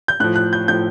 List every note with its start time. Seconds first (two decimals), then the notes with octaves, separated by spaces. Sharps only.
0.08 G6
0.20 A2 F#6
0.24 F3
0.36 F#6
0.53 G6
0.68 A2 F3 G6